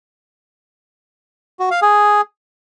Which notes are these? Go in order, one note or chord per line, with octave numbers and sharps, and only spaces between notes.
F#4
F5
G#4